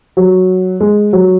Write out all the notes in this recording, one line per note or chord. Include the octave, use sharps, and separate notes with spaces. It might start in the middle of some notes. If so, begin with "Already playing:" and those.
F#3
G#3
F#3